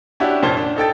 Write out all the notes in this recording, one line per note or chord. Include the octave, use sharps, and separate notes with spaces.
C#4 D4 E4 F#4 G4
F1 A#2 C#4 C5 A5 G7
D4
D#4 A4 G5 A6